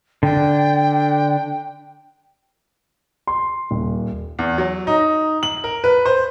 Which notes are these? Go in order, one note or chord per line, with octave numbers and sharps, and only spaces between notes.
D3 D4 G5
C6
D#1
E2
F#3
D#4
F#7
A#4
B4
C5